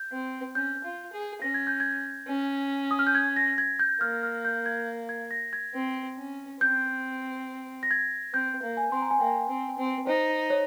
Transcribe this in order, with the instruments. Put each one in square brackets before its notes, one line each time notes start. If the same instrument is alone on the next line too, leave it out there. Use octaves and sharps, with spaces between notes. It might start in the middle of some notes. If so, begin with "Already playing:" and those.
Already playing: [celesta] G6
[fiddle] C4
[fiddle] C#4 [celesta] G6
[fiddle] F4
G#4
[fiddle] C#4 [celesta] A#6
[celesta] G#6
G6
G#6
[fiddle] C#4
[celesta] D#6
F6
G6
G#6
A#6
G#6
G6
[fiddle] A#3 [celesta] F6
[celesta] F6
G6
G#6
G#6
A#6
G#6
[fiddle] C4
C#4
[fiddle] C4 [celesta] G6
[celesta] A#6
G#6
[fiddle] C4 [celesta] G6
[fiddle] A#3
[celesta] G#5
[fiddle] C4 [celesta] C6
[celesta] A#5
G#5
[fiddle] A#3 [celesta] G5
[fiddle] C4
C4
[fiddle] D#4 [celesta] C5
[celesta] C#5